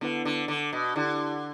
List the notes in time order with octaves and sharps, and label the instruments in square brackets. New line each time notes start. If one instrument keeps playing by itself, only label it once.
[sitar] D3 [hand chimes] B3 E4 B4 F#5
[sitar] D3
D3
B2
[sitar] D3 [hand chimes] E4 G4 D5 F#5